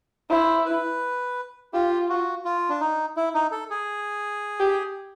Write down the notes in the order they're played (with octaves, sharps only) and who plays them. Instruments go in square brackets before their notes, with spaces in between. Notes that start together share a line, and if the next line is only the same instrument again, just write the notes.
[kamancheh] E4 [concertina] C5
[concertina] B4
[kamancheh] F4 [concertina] G4
[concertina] F#4
F4
D4
D#4
E4
D#4
A4
G#4
[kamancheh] G4